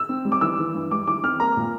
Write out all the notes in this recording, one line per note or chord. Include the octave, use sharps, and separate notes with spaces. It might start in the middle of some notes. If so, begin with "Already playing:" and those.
Already playing: E6
C4
G3
D6
E3 E6
E3
G2
G3 D6
E3 D6
C4 F6
A#3 A#5
A#2